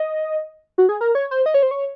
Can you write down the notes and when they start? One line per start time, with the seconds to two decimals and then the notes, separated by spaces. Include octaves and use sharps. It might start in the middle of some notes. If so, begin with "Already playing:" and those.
Already playing: D#5
0.78 F#4
0.89 G#4
1.01 A#4
1.15 C#5
1.31 C5
1.46 D#5
1.54 C#5
1.63 C5
1.71 C#5